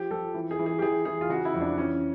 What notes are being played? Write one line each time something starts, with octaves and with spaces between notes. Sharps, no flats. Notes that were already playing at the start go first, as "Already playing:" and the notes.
Already playing: F3 G4
F3 A4
E3
G#4
E3
G#4
G4
E3 G#4
E3 G#4
F4
C#3 F#4
E4
F2
D4
E3 C#4